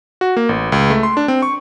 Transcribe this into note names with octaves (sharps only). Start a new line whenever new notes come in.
F#4
A#3
A1
C#2
A3
C6
D4
C4
C#6